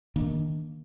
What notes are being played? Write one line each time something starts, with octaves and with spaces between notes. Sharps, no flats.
D#3 A#3 D4